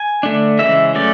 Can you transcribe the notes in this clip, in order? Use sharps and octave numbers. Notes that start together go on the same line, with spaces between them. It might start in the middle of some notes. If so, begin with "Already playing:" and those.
Already playing: G#5
D3 A3 D4
C#3 E3 G#3 E5
F#3 A3 C#4 D5